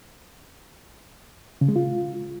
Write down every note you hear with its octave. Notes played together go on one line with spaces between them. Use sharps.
C#3
G#3
F4